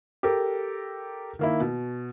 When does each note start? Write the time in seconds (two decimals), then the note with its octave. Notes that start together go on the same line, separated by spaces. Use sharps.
0.23 G4 A4 A#4
1.39 D#3 A#3 E4
1.60 B2